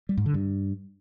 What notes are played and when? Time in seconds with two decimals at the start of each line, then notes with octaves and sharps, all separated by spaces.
0.09 G3
0.17 G#2
0.26 D3
0.34 G2